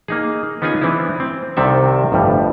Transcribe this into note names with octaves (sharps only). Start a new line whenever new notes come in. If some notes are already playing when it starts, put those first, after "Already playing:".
A#3 D#4 G#4
B3 C#4 D#4 F4 G#4 G#5
E3 B3 C4 D4 E4
C4
C2 C3 D#3 C4 A4 E5
G1 F2 A2 G3